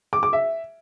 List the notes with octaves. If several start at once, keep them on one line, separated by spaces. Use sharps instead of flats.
D6
D6
E5